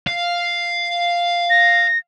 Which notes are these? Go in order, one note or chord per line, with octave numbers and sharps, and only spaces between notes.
F5
A#6